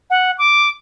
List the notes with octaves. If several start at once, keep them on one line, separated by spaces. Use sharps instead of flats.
F#5
D6